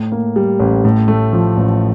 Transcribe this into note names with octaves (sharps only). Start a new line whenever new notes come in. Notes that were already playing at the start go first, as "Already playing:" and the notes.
Already playing: A2
A#3
G3
A1
A2
A3
F3
A1